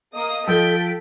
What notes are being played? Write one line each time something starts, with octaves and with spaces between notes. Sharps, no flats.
A#3 D#5 D#6
F3 A4 G5 B6 D7